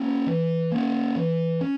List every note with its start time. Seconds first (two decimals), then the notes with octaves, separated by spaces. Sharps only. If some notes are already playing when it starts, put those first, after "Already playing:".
Already playing: A#3 C#4
0.27 E3
0.72 A#3 C#4
1.16 E3
1.61 C#4